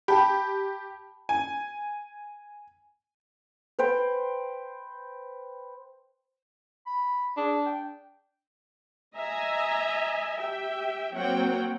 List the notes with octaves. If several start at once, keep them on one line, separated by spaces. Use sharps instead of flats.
G4 G5 A5 B5
G#5
B4 C5 G5
B5
D4 G#4
G5
D#5 E5 G#5 A#5
G4 E5 G5
F#3 A#3 C4 C#5 F#5 G5